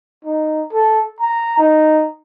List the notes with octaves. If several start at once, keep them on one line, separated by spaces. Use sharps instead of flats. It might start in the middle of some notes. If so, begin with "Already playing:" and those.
D#4
A4
A#5
D#4